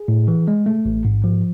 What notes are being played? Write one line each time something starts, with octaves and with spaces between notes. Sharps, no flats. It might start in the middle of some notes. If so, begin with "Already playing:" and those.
Already playing: G#4
A2
E3
G#3
A3
A1
G#2
F3